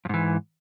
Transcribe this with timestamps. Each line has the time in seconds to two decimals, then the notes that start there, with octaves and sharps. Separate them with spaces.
0.05 F2
0.09 G#2
0.14 E3